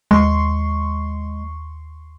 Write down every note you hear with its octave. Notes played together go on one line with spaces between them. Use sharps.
D#2 G#3 C6 C#6